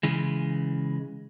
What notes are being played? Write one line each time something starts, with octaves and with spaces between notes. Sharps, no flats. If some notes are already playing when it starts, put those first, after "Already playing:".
C#3 E3 G#3